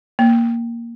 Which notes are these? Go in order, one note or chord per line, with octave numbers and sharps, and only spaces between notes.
A#3